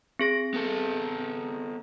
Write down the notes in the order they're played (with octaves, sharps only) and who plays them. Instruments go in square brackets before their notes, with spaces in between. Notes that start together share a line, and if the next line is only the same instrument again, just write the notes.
[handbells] C4 G#4 A#6
[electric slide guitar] B3 A4